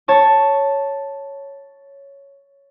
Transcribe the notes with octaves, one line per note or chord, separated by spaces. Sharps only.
C#5 A5 C#6